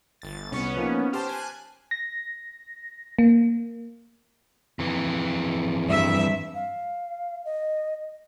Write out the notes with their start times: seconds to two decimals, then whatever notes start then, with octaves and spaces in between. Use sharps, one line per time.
0.22 G1 A6
0.52 C2 B3 C#4 C#6 C#7
0.77 F3 A#3 D#4
1.13 G4 C5 A5 F6
1.29 G#5 F#6
1.91 A#6
3.19 A#3
4.79 F2 E3
5.89 G2 E5
6.55 F5
7.45 D#5